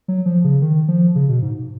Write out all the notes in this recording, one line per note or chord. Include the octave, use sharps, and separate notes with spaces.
F#3
F3
C#3
D#3
F3
C#3
B2
G#2